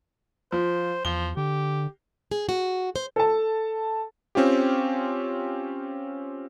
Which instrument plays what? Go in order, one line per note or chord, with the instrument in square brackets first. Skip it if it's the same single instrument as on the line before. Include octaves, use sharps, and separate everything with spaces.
[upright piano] F3 [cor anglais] C5
[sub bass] E2 [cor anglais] F3 [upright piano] G7
[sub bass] D3 [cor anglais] G4
[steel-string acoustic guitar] G#4
F#4
C5
[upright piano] A4 A5
[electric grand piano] C4 C#4 F4 G4